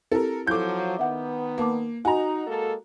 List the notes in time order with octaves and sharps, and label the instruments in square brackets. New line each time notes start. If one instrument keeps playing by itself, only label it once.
[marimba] C4 E4 G4 [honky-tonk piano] A4 A#4
[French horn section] F3 F#3 [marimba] E4 A4 [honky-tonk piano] D6 G6
[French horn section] D#3 B3 [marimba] E5 F#5
[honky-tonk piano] A#3 [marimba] B4 A5 D6
[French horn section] D#4 [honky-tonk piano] F#4 A#5 [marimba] G#5
[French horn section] G#3 A#3 A4